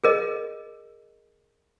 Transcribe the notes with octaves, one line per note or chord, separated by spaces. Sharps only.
G#4 A#4 D#5